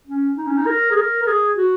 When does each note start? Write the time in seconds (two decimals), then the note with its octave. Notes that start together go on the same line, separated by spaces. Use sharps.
0.07 C#4
0.37 D#4
0.47 C#4
0.57 D#4
0.66 A#4
0.91 G#4
0.97 A#4
1.22 A#4
1.27 G#4
1.57 F#4